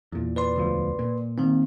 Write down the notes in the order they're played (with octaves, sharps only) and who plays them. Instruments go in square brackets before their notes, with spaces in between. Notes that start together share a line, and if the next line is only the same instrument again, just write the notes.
[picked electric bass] E2 A#2
[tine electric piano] B4 D5 C6
[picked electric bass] E1 D2 F3
A#2
[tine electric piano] D#3 A#3 C4